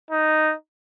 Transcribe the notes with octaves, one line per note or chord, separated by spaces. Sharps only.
D#4